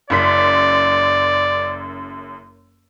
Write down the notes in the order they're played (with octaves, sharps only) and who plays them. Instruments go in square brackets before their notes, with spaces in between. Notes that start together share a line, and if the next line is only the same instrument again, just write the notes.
[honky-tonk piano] F#1 F#2 B6 [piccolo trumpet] D5